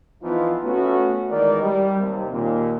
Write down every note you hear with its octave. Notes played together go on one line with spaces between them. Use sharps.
E3 F3 B3 D#4 F4
A3 B3 C#4 F#4
D#3 E3 G#3 A#4 D5
G3
D#2 C3
D#2 A#2